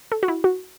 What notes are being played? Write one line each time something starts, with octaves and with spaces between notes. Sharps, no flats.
A4
F#4
E4
F#4